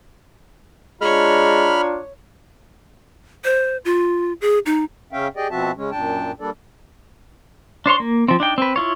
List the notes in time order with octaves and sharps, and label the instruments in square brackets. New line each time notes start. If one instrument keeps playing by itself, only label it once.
[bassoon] G#3 [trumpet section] D4 F4 A#5 [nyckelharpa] C#5 [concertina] B5 F6
[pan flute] C5
F4
G#4
D#4
[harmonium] C#3 C#4 E5 F5 G5
G4 G#4 D5 D#5 G5
B2 F3 C4 F#4 E5 A5
C#3 G#3 C#4
F#2 A#2 D4 G5 A5
G3 A#3 D4 A4 D5
[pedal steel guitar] D4 C5 C#5 C6
A#3
F3 C4
D4 D#4 G5
C4 B4
E4 F4 C#5